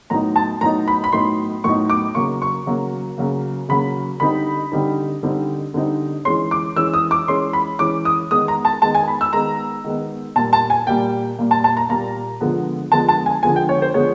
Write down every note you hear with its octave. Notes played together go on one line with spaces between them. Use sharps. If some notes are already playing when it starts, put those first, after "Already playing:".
A2 F#3 B3 D#4 A#5
A5
A2 F#3 B3 D#4 A#5
B5
B5
A2 F#3 B3 D#4 C6
A2 F#3 B3 D#4 C#6
D6
C#3 F#3 A#3 C#6
C#6
C#3 F#3 A#3
C#3 F#3 A#3
C#3 F#3 A#3 B5
D3 G3 C4 D#4 B5
D3 G3 C4 D#4
D3 G3 C4 D#4
D3 G3 C4 D#4
E3 G#3 C#4 C6
D6
E3 G#3 C#4 E6
D#6
D6
E3 G#3 C#4 C6
B5
E3 G#3 C#4 D6
D#6
D#3 G#3 B3 D#6
A#5
A5
D#3 G#3 B3 A5
G#5
B5
E6
D#3 G#3 B3 A#5
D#3 G#3 B3
A#2 G3 A#3 A5
A5
G#5
A#2 G3 A#3 G5
A#2 G3 A#3
A5
A5
A#5
A#2 G3 A#3 A#5
D3 F3 G#3 B3
D3 F3 G#3 B3 A5
A5
G#5
D3 F3 G#3 B3 G#5
G5
C#5
C5
D3 F3 G#3 B3 C#5